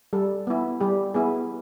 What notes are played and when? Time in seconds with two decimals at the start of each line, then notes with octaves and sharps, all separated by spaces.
0.13 G3 A4
0.47 B3 E4
0.81 G3 G4
1.14 B3 E4 G#4